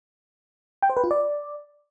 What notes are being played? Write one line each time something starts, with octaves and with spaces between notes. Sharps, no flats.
G5
C5
B4
F4
D5